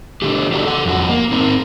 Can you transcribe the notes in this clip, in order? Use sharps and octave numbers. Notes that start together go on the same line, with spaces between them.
D3 A3 G4
A3 D4 D#4 F#4 G4
A4 F#5
F2 F#4
A#3
C4 D#4 A#4